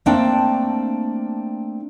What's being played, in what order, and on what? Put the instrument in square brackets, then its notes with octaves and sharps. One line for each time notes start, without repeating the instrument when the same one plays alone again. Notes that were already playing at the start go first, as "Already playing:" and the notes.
[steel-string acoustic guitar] A3 A#3 C4 D4 G5 A5